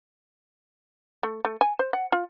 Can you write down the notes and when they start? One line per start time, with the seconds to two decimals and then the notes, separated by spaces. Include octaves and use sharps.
1.23 A3
1.45 A3
1.61 G#5
1.79 C5
1.93 F#5
2.12 F4